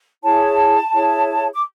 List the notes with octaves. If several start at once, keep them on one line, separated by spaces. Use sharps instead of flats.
E4 G#4 C#5 A5
E4 G#4 C#5
D6